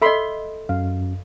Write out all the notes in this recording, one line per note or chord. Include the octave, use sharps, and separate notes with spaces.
A4 D#5 E5 B5 C6
F#2 F5